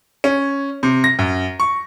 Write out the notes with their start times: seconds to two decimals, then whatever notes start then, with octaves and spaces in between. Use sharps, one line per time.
0.24 C#4
0.83 C3
1.04 A#6
1.19 F#2
1.60 C#6